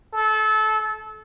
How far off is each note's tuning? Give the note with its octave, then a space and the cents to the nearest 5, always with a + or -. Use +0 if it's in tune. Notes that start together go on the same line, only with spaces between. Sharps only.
A4 -25